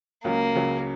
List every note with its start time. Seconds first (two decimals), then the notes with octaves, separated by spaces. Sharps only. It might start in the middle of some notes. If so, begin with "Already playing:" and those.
0.24 C#2 C#3 F#3 A#3
0.55 C#2 C#3 F#3